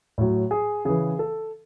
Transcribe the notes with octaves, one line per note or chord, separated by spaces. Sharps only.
A2 F#3
G#4
C#3 E3 G#4
A4